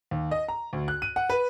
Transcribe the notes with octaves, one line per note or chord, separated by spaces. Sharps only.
D#2
D#5
A#5
D2
F#6
D#7
F#5
B4